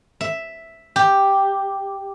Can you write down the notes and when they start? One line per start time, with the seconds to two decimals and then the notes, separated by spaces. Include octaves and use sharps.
0.21 E5
0.96 G4